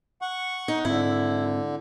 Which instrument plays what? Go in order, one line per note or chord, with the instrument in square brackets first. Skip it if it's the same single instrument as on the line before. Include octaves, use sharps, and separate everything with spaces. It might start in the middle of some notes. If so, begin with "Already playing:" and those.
[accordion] F#5 C#6
[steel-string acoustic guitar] D#4
[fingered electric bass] G#2 C4 [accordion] D3 [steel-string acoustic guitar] E4